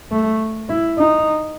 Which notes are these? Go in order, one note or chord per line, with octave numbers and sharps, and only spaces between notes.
A3
E4
D#4